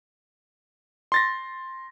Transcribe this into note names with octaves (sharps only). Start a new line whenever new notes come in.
C6 A6 A#6